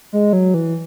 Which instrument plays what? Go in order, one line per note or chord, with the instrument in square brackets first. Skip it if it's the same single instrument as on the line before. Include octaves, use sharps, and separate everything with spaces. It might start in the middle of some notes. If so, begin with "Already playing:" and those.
[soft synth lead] G#3
F#3
E3